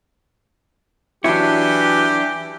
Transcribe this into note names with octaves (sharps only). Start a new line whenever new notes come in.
E3 F#3 D4 E4 G4 C#5